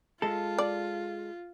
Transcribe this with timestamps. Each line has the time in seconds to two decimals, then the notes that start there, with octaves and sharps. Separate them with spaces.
0.22 G#3 F4 A4
0.58 D5